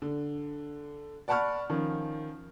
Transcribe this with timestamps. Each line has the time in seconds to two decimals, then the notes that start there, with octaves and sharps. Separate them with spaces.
0.02 D3
1.28 D5 F#5 A5 B5 C#6 F6
1.69 D#3 F3 C#4